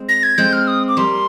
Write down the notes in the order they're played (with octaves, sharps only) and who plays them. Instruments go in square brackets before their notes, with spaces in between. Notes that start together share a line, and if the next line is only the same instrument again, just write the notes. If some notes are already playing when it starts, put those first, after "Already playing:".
Already playing: [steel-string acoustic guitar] G#3 C4
[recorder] A#6
G#6
[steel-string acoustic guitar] G#3 C4 [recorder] G6
[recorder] F6
D#6
D6
[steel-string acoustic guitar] G3 A#3 [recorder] C6